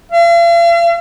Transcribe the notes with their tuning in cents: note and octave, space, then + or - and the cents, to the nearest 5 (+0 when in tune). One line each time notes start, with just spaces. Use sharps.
F5 -45